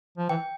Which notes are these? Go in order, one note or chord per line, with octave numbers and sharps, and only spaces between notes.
F3
E3 G5